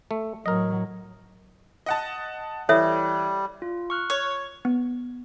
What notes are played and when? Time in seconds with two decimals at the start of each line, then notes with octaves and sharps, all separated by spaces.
0.11 A3
0.46 A2 F#3 A#4 D#5
1.86 D#5 F#5 A5
2.69 E3 G3 A4 C#5 E5
3.62 F4
3.90 C#6 F6 F#6
4.10 C#5
4.65 B3